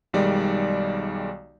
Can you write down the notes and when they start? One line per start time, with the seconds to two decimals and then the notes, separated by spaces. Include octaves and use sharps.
0.13 B1 D#3 G3 G#3 D5